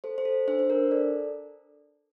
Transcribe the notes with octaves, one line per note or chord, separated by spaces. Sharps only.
A4 C5
C5
A4
D4 C5
C5
D4 A#4
A4 D5